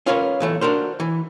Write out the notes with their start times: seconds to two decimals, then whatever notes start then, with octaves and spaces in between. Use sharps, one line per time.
0.06 C#4 F4 A#4 B4 C#5
0.40 B1 E3 A3
0.61 D4 F#4 A#4 C5
1.00 E3